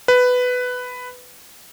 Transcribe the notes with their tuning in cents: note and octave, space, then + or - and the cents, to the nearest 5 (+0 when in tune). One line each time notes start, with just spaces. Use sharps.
B4 +10